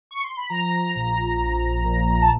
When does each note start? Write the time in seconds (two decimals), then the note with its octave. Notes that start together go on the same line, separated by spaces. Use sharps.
0.11 C#6
0.23 C6
0.37 B5
0.49 F3 A#5
0.95 A#1
1.39 A#1
1.84 A#2
2.22 A5